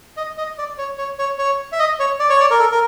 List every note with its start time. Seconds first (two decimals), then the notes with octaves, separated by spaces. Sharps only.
0.17 D#5
0.38 D#5
0.58 D5
0.78 C#5
0.98 C#5
1.19 C#5
1.39 C#5
1.72 E5
1.79 D#5
2.00 C#5
2.20 D5
2.30 C#5
2.40 D5
2.51 A#4
2.59 A4
2.72 A#4